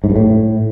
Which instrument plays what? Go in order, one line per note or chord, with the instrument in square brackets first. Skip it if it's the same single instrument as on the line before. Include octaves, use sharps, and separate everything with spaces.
[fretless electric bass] G#2
G2
A2